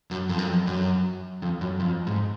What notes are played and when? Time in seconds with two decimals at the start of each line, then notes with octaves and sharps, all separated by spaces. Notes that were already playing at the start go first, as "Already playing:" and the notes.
0.11 F#2
0.29 F2
0.38 F#2
0.48 F2
0.67 F#2
1.42 F2
1.61 F#2
1.80 F2
2.07 G#2